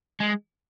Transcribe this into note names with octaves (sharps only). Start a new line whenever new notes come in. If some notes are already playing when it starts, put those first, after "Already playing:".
G#3